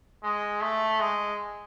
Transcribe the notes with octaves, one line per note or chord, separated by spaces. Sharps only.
G#3
A3
G#3